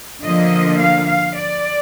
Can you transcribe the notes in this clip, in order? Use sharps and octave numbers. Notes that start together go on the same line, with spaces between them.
D3 F3 A#3 D#5
F5
F5
D5